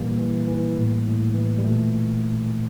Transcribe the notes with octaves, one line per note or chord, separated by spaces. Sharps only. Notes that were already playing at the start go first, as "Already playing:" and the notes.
Already playing: A#2 E3 G3 A#3
E3
E3
A2
A2
E3
G3
A#2 A3